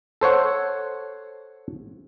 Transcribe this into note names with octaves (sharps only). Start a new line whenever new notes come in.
A4 C5 C#5 F#5